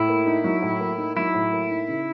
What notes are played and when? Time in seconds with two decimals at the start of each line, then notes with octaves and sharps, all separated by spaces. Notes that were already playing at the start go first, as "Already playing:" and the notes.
Already playing: A2 E4
0.09 A#3
0.26 D#4
0.44 F#3
0.62 A2
0.80 A#3
0.98 D#4
1.16 F#3 E4
1.34 A2
1.53 A#3
1.70 D#4
1.88 C#3